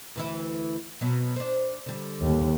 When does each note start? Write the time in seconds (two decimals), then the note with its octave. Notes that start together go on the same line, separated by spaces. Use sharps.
0.16 D2 E3 E4
1.01 B2 F#3
1.36 D4 C5
1.86 D3 G3
2.19 D#2